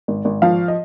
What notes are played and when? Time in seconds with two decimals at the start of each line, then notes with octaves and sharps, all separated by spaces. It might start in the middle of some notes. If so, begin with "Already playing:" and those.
0.08 G#1
0.25 G#1
0.42 F3 F5
0.68 D#5